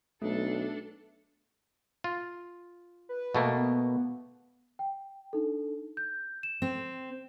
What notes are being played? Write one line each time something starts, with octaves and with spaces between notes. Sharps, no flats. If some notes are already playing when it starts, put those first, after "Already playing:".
B1 A3 D4 A4
F4
B4
B2 A3 A#3
B3
G5
D4 D#4 A4
G6
E7
C4